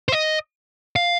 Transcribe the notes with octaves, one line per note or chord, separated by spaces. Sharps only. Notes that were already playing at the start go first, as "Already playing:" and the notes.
C5
D#5
F5